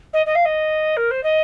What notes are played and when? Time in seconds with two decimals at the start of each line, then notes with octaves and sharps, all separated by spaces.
0.13 D#5
0.26 D#5
0.35 F5
0.45 D#5
0.97 A#4
1.11 C5
1.23 D#5